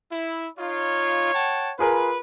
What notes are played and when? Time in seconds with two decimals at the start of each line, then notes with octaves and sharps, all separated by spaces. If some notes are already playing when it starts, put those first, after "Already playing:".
0.12 E4
0.58 D#4 F4 C#5
1.35 F#5 G5 A5
1.79 F4 G#4 A#4 B4